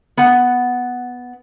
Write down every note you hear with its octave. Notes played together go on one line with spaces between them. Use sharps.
B3 F#5